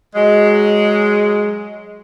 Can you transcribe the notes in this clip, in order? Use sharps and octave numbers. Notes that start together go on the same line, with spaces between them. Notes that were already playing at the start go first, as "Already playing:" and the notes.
F#3 G#3